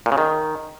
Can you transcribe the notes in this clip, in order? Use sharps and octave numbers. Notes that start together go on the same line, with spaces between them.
A#2
C#3
D#3